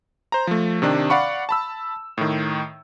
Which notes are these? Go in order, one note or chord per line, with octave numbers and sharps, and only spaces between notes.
C5 A#5
F3 A3
C3 D#3 D4
D5 F5 F#5 B5 C#6
A5 B5 E6
A2 D#3